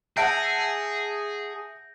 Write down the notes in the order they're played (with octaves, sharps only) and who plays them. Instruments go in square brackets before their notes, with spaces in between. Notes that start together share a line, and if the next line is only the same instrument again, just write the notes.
[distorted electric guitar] G#4 [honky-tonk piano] E5 F#5 A5 [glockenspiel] G6 A#6 D7